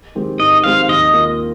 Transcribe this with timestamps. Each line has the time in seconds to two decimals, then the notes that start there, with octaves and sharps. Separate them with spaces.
0.15 D#3 G#3 C4 G4
0.40 G#2 D#5
0.64 D#3 G#3 C4 G4 F5
0.89 D#2 D#5
1.13 D#3 A#3 F4